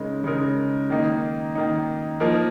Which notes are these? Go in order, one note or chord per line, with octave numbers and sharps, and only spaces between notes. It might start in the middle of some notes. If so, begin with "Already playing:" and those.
Already playing: C#3 G#3 D#4 A#4
C#3 G#3 D#4 A#4
D#3 A#3 D#4
D#3 A#3 D#4
F3 A#3 D#4 A#4